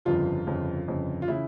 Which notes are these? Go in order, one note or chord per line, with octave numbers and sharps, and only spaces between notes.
G1 F2 C#3 F3 F4
G1 F2 C#3
G1 F2 C#3
F4
C#3 E3 E4